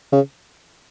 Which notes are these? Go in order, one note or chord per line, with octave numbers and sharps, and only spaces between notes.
C#3